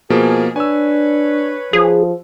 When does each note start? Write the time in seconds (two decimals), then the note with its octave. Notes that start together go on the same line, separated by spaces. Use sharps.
0.10 B2 F3 A#3 G#4
0.56 D4 B4 C#5 G#5 E6
1.73 F3 G#4